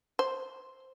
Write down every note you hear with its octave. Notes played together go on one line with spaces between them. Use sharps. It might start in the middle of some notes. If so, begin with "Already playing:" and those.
C5